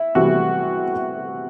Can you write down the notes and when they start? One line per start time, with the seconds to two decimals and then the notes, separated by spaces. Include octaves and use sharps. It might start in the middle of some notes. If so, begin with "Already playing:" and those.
Already playing: E4
0.15 C3 E3 G3 F#4